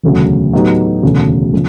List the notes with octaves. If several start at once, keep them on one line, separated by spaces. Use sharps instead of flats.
E1 D2 C#3 F#3
A2 F#3 B3 D#4 G4
E1 D2 C#3
C#3 F3